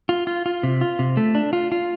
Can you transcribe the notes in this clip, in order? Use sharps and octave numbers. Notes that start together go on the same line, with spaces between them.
F4
F4
F4
C3
F4
C3
A3
D4
F4
F4